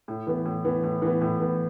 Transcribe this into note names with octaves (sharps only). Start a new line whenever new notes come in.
A2
E3 B3
A2
E3 B3
A2
E3 B3
A2
E3 B3